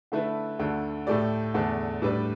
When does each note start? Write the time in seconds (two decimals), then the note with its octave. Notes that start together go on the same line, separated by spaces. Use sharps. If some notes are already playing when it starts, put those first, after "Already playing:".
0.12 D3 A3 E4 B4
0.59 D2 D3 A3
1.07 A2 A3 G4 D5
1.54 E2 D3 A3 D4
2.02 A2 G3 D4 B4 D5